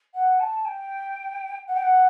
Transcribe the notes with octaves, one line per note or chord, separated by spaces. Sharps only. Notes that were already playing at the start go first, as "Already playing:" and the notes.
F#5
A5
G5
F#5
G5
F#5